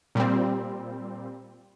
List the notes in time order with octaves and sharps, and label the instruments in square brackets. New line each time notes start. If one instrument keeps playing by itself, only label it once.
[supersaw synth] A#2 G3 C4